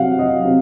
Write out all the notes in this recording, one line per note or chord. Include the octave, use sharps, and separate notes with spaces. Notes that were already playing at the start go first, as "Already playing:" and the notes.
Already playing: C3 F#3 F5 F#5
F#3 D#5
C3